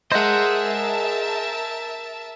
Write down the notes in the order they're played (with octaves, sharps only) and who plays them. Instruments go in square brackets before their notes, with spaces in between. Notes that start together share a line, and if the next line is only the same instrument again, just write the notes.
[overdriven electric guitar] G#4 D#5 [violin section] A#4 E5 A5 [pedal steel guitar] C5 F#5